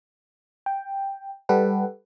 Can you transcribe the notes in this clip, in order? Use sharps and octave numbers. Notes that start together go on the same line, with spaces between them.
G5
G3 G4 A4 B4 F#5